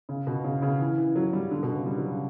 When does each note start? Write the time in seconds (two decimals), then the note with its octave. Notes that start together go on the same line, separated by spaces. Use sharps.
0.09 C#3
0.27 B2
0.44 C#3
0.62 C#3
0.80 E3
0.98 E3
1.16 F#3
1.33 G3
1.51 D3
1.63 B2
1.74 C#3
1.86 G3
1.98 F#3
2.09 C#3